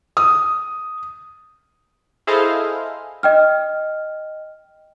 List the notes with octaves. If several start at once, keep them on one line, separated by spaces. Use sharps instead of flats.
D#6
E4 G#4 A4 C5 D#5 F5
D#5 G5 F6